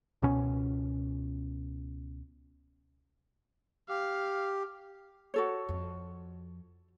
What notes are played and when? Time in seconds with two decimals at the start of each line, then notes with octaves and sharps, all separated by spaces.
0.22 C#2 B2 C#4
3.89 G4 F5
5.34 F#4 A4 C#5
5.69 F2